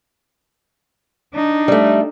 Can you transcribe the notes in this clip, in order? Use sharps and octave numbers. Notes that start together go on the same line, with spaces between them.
D4 D#4
G3 A3